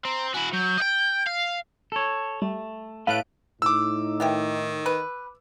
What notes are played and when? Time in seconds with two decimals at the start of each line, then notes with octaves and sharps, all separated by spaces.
0.05 C4 A#5
0.34 E4 F#4 G#5
0.53 F#3 G6
0.78 D#5 G5
1.27 F5
1.92 A4 C#5
2.42 G3 A3
3.07 A2 A4 B4 F5 F#6 D7
3.62 A2 D#4 D6 E6
4.20 D#3 B3 E4 G4
4.86 B4